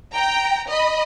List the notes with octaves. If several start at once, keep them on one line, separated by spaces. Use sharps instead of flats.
G5 A#5
D#5 B5